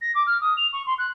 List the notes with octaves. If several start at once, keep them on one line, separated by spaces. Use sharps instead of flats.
A#6
D6
F6
D#6
F7
C#6
C6
F#6